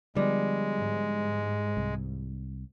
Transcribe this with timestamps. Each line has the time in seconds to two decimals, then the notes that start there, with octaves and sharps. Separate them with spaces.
0.16 D3 F3 G3 G#3 B3
0.74 G#2
1.77 C2